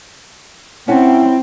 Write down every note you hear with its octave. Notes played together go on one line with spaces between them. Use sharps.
C4 C#4 E4 F#5 G5 A5